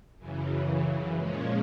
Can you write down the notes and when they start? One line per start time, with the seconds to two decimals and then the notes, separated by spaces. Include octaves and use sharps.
0.18 F#2 C#3 E3
1.15 A#2 F3 G#3 C#4